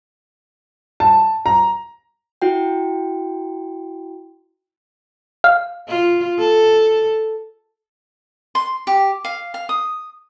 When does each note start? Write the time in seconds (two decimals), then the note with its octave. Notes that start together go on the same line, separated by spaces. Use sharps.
1.00 A5
1.46 A#5
2.42 E4 F#4 G5
5.44 F5
5.89 F4
6.39 A4
8.55 C6
8.87 G4
9.24 F5
9.54 F5
9.69 D#6